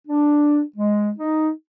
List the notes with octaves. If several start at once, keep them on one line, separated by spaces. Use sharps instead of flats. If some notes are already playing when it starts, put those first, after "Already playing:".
D4
G#3
D#4